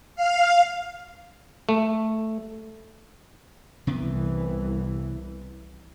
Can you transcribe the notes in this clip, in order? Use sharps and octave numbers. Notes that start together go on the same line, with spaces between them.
F5
A3
C2 C3 E3 B3